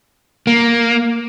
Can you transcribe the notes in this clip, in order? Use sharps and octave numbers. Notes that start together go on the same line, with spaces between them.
A#3